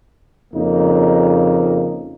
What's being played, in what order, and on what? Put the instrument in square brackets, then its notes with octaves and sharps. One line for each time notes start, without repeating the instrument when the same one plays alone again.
[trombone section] F2 C#3 A#3 D#4